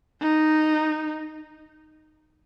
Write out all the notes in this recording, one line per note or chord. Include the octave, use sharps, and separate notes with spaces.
D#4